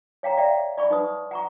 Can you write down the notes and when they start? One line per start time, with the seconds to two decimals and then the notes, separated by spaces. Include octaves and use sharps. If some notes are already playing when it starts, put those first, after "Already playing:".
0.23 C#5 F5 G5 A#5
0.37 D5 E5 F5 G5 A#5
0.78 D5 B5 C#6
0.90 D#4 B4 D#6
1.31 F#5 A#5 C#6